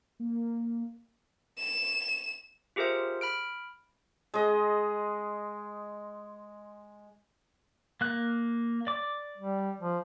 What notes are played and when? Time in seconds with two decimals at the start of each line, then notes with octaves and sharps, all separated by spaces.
0.20 A#3
1.58 E7
2.76 F4 G4 G#4 A#4 C5 E5
3.21 B5 F6 D7
4.34 G#3 D#5
8.01 A#3 F#6
8.87 D5 D6
9.37 G3
9.80 F3